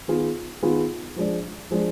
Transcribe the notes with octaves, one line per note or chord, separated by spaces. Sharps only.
D#3 B3 F4 G#4
D#3 B3 F4 G#4
F3 G#3 D4
F3 G#3 D4